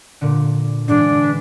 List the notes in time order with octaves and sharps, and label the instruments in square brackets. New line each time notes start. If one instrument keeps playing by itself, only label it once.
[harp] A#2 D3
[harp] G#2 E3 G#3 [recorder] D4
[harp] B4